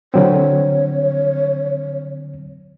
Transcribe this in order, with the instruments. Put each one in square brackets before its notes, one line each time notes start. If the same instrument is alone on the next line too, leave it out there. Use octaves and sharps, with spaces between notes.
[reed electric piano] D3 F#3 C4 [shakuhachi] C#5